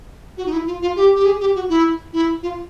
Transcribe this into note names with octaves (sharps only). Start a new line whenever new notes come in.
F#4
D#4
E4
F4
F4
G4
G4
G#4
G4
F#4
E4
E4
F4